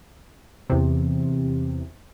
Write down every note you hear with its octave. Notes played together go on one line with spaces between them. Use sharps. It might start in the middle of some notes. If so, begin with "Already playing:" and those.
E2 C3